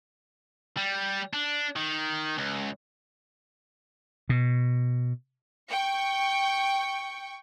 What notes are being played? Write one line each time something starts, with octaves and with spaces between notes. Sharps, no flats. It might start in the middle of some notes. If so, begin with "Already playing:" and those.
G3
D4
D#3
C#2
B2
G5 C#6